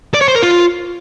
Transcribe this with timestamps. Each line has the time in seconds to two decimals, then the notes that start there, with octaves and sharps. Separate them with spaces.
0.14 D5
0.21 C#5
0.28 C5
0.35 A#4
0.42 F4